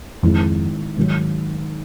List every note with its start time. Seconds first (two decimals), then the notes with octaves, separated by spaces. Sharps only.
0.23 F2 G#2 D#3 G#3 C4 E4
0.97 G#2 D#3 F#3